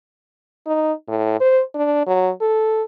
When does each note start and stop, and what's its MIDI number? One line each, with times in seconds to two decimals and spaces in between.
0.66 0.92 63
1.08 1.39 45
1.40 1.61 72
1.74 2.05 62
2.07 2.30 54
2.41 2.82 69